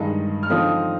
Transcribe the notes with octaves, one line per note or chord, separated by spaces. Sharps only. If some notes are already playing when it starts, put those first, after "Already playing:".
Already playing: G2 D#3 G#3 D#4
F6
D3 F3 C4 D#4 D#6